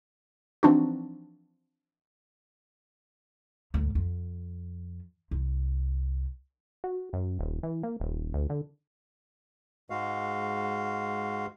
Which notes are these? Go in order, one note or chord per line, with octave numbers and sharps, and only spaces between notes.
E3 F3 C4 D4 D#4 F#4
D2 G#2
F2
C2
F#4
F#2
D#1
E3
A#3
D#1
D2
D3
G#2 G#3 F#4 F5